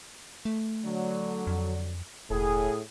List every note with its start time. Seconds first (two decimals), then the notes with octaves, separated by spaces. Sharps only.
0.45 A3
0.85 D3 F#3
1.47 F2
2.30 E1 A2 G#4